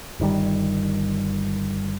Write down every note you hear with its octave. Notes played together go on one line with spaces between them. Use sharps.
G1 D#3 G3